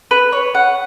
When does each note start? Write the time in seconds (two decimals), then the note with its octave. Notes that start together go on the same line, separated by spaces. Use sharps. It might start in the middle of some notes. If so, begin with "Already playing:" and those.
0.11 B4
0.33 C#5
0.55 F#5